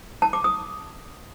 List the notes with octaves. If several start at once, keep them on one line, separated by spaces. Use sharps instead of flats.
A5
D6
D#6